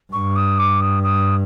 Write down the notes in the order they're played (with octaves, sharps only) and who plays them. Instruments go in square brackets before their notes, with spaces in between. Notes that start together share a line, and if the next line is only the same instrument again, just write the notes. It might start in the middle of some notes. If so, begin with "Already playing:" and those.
[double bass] G2 [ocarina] C#6
[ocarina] D#6
D6
D#6
D#6